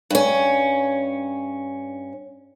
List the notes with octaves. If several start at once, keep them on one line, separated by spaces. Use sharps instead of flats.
G2 C#4